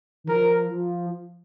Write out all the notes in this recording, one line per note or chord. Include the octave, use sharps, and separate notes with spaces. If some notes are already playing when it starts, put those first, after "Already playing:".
D#3
F3 A#4
F3